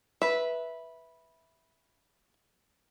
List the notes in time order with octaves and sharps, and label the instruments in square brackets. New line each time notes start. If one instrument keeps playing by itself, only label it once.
[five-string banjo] B4 E5